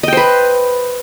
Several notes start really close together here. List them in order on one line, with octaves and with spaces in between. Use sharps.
D#5 G5 C5 B4